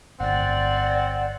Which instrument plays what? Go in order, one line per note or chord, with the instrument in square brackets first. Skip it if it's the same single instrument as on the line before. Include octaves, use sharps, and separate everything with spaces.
[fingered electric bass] G1 A2 [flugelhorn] C4 [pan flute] D5 [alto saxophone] F#5